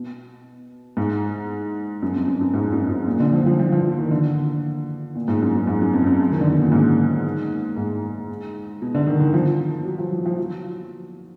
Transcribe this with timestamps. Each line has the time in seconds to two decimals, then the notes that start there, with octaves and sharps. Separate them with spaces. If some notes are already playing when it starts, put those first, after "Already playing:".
Already playing: B2
0.97 G#2
2.02 F#2
2.16 F2
2.28 F#2
2.41 F#2
2.54 G#2
2.72 F#2
2.89 F#2
3.06 A#2
3.20 D3
3.33 F3
3.46 F3
3.59 F3
3.72 F3
3.99 D#3
4.11 D3
5.15 A#2
5.28 G#2
5.42 F#2
5.55 F#2
5.67 G#2
5.81 F#2
5.93 F2
6.07 F#2
6.30 D#3
6.41 D3
6.51 B2
6.62 A#2
6.72 G#2
7.76 G#2
8.82 B2
8.95 D3
9.07 D#3
9.20 D#3
9.34 F3
9.85 F#3
9.99 F3
10.12 F3
10.26 F3
10.38 F#3